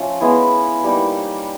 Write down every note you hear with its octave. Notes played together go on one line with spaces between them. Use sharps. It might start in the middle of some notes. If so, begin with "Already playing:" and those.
Already playing: F3 A3 C#4
G#3 B3 E4
G3 A#3 D#4